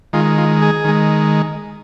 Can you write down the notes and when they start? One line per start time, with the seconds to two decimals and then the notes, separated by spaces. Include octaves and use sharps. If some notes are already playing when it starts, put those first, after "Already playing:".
0.13 D#3 G#3 F4
0.38 F4
0.62 G#4
0.85 D#3 G#3